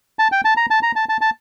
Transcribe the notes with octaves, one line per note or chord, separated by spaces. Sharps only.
A5
G5
A5
A#5
A5
A#5
A5
A5
A5